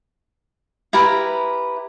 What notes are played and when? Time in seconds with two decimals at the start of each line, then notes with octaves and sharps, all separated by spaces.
0.93 E4 G4 A#4 B4